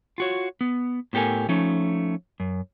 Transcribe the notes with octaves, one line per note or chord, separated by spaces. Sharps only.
F4 F#4 C#5
B3
A2 B3 G4 A4 A#4 G#5
F3 A3 C#4 D#4
F#2